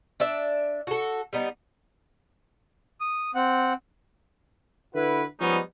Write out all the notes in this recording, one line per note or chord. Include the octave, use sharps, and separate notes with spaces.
D4 D5 E5
F#4 A4
G3 B3 D#4
D#6
C4 F#5
D3 E4 F#4 B4
F3 G3 G#3 B3 C#4 D#4